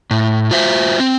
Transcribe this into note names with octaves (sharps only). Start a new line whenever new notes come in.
A2
F4 F#4 C5 E5
C4